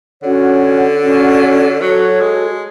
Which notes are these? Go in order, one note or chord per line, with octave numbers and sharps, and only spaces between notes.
D3 C#4 F#4 C#5 F#5
C#4 F#4 C#5 F#5
F#3 F#4 A4 C#5
G#3